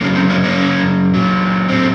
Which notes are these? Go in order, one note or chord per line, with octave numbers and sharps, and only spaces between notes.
F#2 C#3 F#3 A#3 C#4
C4
A#3 C#4
A#3 C#4
A#2 F#3
C4